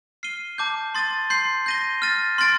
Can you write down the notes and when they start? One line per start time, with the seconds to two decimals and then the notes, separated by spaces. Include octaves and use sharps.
0.23 F6 C7 D#7 G7
0.58 A5 D6 G6
0.95 C6 D#6 A6 D#7 G7
1.30 C6 G6 C7
1.66 G6 A#6 D#7 G7
2.02 F6 A6 D#7
2.38 C6 F6 A6 D7